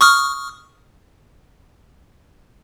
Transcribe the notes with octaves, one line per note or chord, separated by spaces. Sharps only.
C#6 D#6 F6